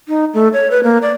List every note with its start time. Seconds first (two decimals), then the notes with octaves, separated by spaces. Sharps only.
0.08 D#4
0.34 A3
0.53 C#5
0.71 B4
0.84 A#3
1.02 D5